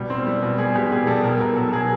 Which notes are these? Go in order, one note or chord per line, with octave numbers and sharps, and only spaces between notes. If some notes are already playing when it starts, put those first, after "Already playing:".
Already playing: B2 G3
C4
G3
B2
G3 G#4
B2 G4
B2 G#4
G3 A4
B2 A#4
B2 A#4
F#3 A4
B2 G#4